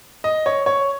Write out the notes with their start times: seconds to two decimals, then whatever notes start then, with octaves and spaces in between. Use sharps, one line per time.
0.24 D#5
0.46 C#5
0.66 C#5